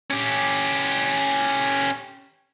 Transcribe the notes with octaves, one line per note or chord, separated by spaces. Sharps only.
C#4 G4